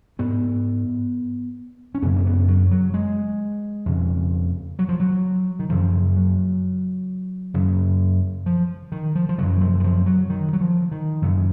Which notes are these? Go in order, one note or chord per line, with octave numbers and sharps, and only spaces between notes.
G#2 B3
C#4
F#2 C#3 B3
A#3
B3
F#3
F#3
G#3
F2 C#3
F#3
F3
F#3
D#3
F#2 C#3 F3
F#3
F#2 C#3
F3
D#3
F3
F3
F#2 C#3 F#3
F3
D#3
F3
F#3
D#3
F#3
F3
D#3
F#2 C#3